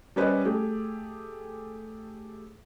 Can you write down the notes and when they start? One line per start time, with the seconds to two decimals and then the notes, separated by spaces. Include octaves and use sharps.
0.16 G3 C#4 B4 C5 D5 D#5
0.45 A3 G4 G#4